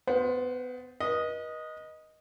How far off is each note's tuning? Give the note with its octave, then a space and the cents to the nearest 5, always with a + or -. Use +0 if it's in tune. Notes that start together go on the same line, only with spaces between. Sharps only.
B3 +25 C5 +0 F#5 -40
B4 -40 D#5 +0